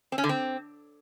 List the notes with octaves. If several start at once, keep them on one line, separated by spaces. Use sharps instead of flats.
C4
C#4
D3
C4